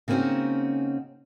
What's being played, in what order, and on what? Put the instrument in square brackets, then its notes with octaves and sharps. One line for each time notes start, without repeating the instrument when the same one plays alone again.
[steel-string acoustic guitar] C#3 A#3 C4 C#4 D#4 F#4